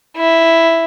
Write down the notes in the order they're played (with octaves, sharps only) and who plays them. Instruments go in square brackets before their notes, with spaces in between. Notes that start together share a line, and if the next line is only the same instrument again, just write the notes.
[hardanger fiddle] E4